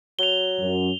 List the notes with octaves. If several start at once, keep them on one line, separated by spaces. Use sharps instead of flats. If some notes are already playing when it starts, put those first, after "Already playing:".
F#3 F7 G7
F#2